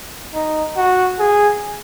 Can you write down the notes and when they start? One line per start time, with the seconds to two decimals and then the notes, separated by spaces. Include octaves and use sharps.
0.34 D#4
0.77 F#4
1.19 G#4